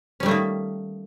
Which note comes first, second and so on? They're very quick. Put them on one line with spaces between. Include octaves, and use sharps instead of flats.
C#4 G3 A3 A#3 D#3